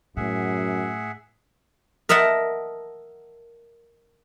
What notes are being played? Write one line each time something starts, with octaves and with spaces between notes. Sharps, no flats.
F#2 A2 G#4 E5 F#5
A#4 D#5 E5 F#5 A5